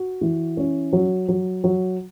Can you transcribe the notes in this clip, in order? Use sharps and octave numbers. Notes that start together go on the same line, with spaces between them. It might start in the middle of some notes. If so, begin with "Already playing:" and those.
Already playing: F#4
E3
C#4
F#3
F#3
F#3